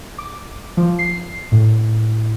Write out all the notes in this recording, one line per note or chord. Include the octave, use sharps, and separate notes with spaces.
D6
F3
C7
A2